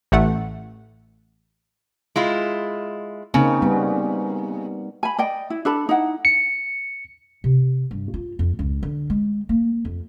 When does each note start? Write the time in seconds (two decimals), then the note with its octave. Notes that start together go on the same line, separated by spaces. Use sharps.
0.12 A1 A3 F#5
2.16 G#3 E4 F4
3.34 C#3 A#3 C4 D#4
3.62 G3 B3
5.03 G#5 B5
5.18 D5 D#5 G5
5.50 E4
5.65 D4 A4 B5
5.89 D#4 E4 F#5
6.25 C#7
7.44 C3
7.91 G2
8.14 F4
8.39 F2
8.59 C#2
8.83 D3
9.10 G#3
9.49 A#3
9.85 F2